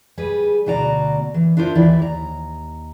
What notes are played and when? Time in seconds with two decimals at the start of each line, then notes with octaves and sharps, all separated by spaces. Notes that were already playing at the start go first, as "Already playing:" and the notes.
0.17 G3 G#4 B4
0.66 D2 B2 F#4 D5 A#5
1.34 E3
1.57 D4 E4 F4 A#4 C5
1.75 D#2 E3 E4 D5 E5
1.99 D#2 A#5